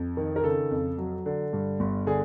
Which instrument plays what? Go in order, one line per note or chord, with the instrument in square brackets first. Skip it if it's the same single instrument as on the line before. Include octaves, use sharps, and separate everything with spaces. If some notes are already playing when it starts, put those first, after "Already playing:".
Already playing: [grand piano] F2
D#3
A#4
C#3 A4
F2
F#3
D3
G2
G1
D3 G#4